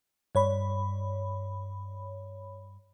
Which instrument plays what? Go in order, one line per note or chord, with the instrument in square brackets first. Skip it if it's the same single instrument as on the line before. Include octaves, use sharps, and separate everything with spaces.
[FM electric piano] G2 C#5 B5